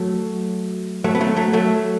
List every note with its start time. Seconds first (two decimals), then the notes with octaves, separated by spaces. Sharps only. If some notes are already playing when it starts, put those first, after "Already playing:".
Already playing: F#3 A3
1.04 F#3 A3
1.15 B3
1.21 F#3 A3
1.36 F#3 A3
1.53 F#3 A3